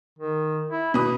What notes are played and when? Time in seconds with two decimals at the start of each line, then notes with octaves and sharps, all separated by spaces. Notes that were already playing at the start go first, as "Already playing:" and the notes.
0.19 D#3
0.71 E4
0.94 B2 B4 D#6